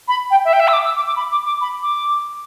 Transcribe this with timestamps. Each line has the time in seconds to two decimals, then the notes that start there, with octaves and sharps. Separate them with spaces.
0.08 B5
0.31 G5
0.45 E5
0.53 G5
0.60 E5
0.68 E6
0.73 D6
0.85 E6
0.96 D6
1.07 D6
1.16 B5
1.31 D6
1.46 D6
1.61 B5
1.82 D6